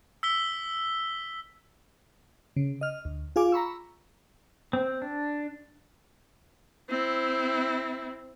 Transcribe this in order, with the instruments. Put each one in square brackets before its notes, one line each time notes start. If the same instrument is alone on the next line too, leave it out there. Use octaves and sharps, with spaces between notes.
[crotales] E6 B6 G7
[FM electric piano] C#3
D#5 F6
D2
F4 G#4 F5 G#5 D6
A#5 B5 C#6 E6
[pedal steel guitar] C4
D4
[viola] C4 E4